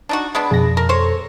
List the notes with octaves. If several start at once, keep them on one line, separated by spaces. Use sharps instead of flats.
D4 D#4 F#4
G#3 B3 D4 B5
F2 B2 G#4 A#6
A4 A#4
C5 C#5